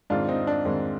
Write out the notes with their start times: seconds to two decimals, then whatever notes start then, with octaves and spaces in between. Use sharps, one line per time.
0.10 G#2 D#3 G#3 C4 D4 F4
0.29 C4 D#4
0.47 D4
0.65 G#2 D#3 G#3 C4